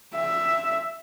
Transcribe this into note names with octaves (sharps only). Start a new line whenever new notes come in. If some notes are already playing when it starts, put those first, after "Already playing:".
E5